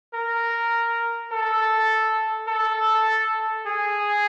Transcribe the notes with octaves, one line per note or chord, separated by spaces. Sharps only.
A#4
A4
A4
G#4